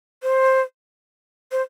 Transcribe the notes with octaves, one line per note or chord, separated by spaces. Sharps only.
C5
C5